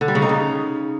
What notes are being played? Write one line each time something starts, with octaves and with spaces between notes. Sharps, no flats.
D3
G3
C#3
D#4
C#3